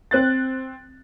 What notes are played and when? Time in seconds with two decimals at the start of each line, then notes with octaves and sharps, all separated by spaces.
0.11 C4 F#6 A6